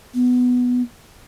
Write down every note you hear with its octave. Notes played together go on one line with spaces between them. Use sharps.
B3